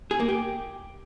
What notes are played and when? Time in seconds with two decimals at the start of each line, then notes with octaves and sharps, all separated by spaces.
0.11 G#4
0.20 A#3
0.29 G4